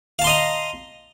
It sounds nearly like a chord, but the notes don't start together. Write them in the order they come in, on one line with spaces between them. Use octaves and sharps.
F5 A5 C6 D#5 A#5